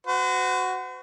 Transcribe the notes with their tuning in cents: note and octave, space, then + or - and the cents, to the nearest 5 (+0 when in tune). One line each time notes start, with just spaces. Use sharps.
F#4 +0 C5 -45